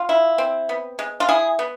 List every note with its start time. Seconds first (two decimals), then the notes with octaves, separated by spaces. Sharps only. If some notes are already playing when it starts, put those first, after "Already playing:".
Already playing: F4
0.09 E4
0.38 C4
0.69 B3
0.99 G#3
1.20 F4
1.29 E4 G#4
1.59 B3